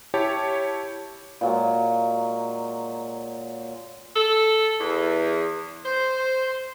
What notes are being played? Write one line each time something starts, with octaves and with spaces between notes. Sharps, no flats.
E4 G4 C#5 A5
A#2 F#3 G#3
A4
E2
C5